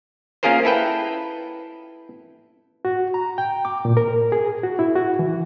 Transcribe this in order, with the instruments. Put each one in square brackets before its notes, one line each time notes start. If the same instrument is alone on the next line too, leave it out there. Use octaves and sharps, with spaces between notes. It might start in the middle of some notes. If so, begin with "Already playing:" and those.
[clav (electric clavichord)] A#3 C#4 F4 G#4 A#4 C5
E4 A4 B4 G5
[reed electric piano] F#4
A#5
G5
D6
A#2
A#4
G#4
F#4
E4
F#4
E3